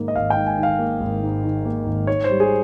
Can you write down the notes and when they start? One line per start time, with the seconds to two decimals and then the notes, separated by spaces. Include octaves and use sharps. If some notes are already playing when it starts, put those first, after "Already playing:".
Already playing: G#2 D#3 A#3
0.08 D#5
0.16 G#1 F5
0.30 G5
0.36 G#2
0.47 G#5
0.58 D#3
0.63 F5
0.79 A#3
1.00 G#1
1.23 G#2
1.44 D#3
1.65 A#3
1.86 G#1
2.07 G#2 C#5
2.24 C5
2.30 G3
2.40 G#4